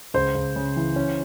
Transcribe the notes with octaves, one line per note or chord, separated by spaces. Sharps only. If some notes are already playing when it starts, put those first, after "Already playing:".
C#2 C5
C#2
C#3
E3
C#4